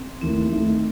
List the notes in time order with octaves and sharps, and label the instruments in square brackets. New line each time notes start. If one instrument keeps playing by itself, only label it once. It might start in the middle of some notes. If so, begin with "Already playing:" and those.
Already playing: [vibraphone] C4
[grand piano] D#2 D#3 A3 E4 [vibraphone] C4
[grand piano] D#3 A3 D#4 A4